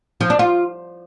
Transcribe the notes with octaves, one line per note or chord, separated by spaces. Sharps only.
F3
D4
F4